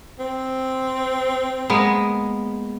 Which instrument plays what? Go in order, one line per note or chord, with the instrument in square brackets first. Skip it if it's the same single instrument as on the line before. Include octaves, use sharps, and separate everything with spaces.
[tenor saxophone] C4
[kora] G#3 A#3 B3